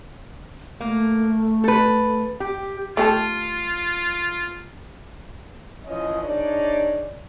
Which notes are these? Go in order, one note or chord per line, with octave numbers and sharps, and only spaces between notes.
A3 A#3
A4 B4
G4
A3 F4 G4 A4
E3 F3 C#4 C#5 D#5
D4 D#4 G#4 C#5 D5